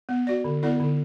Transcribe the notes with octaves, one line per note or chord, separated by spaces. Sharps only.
B3
F#4 D5
D3
B3 E4 A4 D5
D3